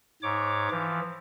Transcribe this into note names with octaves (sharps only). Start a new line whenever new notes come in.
G#2 C#5 D6
E3 F3